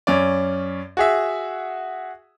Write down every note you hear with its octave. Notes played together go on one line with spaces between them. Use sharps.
F#2 C#4 D5
F#4 G#4 E5